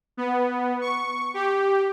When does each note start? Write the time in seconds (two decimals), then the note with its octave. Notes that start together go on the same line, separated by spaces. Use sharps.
0.17 B3
0.81 C#6
1.34 G4